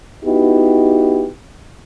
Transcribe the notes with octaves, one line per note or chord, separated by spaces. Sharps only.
B3 D#4 E4 F#4 G4